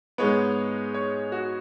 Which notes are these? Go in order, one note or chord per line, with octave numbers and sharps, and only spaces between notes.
G#2 G#3 B3 C#5
C#5
F#4